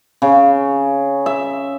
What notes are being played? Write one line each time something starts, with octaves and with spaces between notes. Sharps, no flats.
C#3
E5